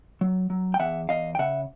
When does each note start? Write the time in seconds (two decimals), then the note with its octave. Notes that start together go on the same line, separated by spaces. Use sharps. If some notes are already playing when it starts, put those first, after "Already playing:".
0.21 F#3
0.50 F#3
0.74 G5
0.79 E2 E5 F#5
1.09 E2 D#5 F5
1.35 G5
1.39 C#3 E5 F#5